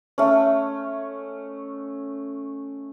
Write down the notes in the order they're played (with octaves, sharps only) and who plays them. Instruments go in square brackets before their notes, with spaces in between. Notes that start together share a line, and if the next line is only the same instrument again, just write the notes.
[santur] A3 C#4